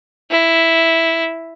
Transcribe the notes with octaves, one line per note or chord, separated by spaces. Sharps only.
E4